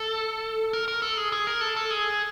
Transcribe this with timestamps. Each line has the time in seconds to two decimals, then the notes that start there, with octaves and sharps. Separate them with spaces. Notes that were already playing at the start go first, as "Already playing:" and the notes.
Already playing: A4
0.73 A#4
0.88 A#4
1.02 A4
1.17 G#4
1.32 G#4
1.47 A#4
1.61 A4
1.76 A4
1.91 G#4